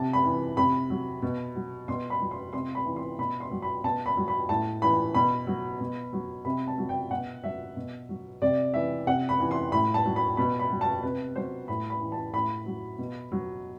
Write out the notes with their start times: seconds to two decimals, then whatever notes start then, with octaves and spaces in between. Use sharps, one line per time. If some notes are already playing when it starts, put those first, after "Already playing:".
Already playing: C3 A5
0.13 B5
0.24 E3
0.57 C3 B5
0.90 F#3
1.22 B2
1.55 F#3
1.88 B2 C6
2.10 B5
2.20 F#3
2.31 C6
2.53 C3 C6
2.75 B5
2.86 E3
2.96 C6
3.19 B2 B5
3.40 C6
3.51 F#3
3.62 B5
3.84 B2 A5
4.06 B5
4.17 F#3
4.28 B5
4.49 A2 A5
4.82 E3 B5
5.14 B2 B5
5.47 F#3
5.80 B2
6.13 F#3
6.45 C3 B5
6.68 A5
6.78 F#3
6.89 G5
7.11 B2 F#5
7.44 F#3 E5
7.76 B2
8.09 F#3
8.42 C3 D5
8.74 E3 E5
9.07 C3 F#5
9.29 B5
9.40 E3
9.51 C6
9.72 A2 B5
9.94 A5
10.05 F#3
10.16 B5
10.37 B2 B5
10.59 B5
10.71 F#3
10.81 A5
11.03 C3 B4
11.36 F#3 C5
11.68 A2 B5
11.90 B5
12.01 E3
12.12 A5
12.33 A2 B5
12.66 F#3
12.98 B2
13.32 F#3